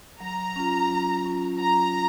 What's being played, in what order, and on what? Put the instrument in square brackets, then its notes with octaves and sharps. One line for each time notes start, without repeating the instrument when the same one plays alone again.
[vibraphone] F#3 [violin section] A#5
[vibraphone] C#4 F4
F#3
C#4 F4
[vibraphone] F#3 [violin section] A#5